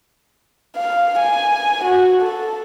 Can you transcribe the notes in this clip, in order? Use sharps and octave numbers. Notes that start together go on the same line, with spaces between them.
F5
G#5
F#4
A4